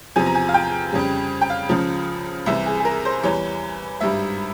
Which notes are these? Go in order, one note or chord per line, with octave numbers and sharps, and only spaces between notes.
E2 C3 F3 G#5
A#5
G#5
F5
G5
F2 C#3 G3
G5
F5
C#2 C#3 F3
C2 C3 E3 E5
G#4
G#4
A#4
C5
E2 E3 G3 C#5
G#1 G2 G3 E5